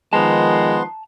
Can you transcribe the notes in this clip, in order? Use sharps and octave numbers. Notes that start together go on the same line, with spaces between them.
D#3 F3 G#3 B3 A5 A#5 C6